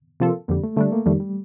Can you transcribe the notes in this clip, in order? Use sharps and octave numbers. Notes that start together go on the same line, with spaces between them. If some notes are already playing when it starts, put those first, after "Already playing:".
C3 F3 A#3 F4 A4
F2 D3 G3 A#3
A3
D3 G3 A3 D4
A#3
F2 D#3 G3 A3
G3